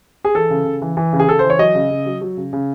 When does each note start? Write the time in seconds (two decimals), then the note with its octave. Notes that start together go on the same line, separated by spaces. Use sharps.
0.25 G#4
0.35 E3 A4
0.50 C#3
0.65 C#3
0.82 E3
0.97 E3
1.13 C#3
1.20 G#4
1.28 C#3 A4
1.39 E3 C5
1.50 C#5
1.59 F#3 D#5
1.75 C#3
1.91 C#3
2.06 F#3
2.21 F#3
2.37 C#3
2.53 C#3